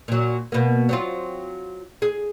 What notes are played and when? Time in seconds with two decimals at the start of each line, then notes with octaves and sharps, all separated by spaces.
0.08 A#2 F#3
0.52 B2 A#3
0.89 F#3 C4 F4
2.02 G#4